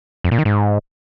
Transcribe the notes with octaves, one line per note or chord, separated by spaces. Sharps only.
F2
A#2
D#3
G#2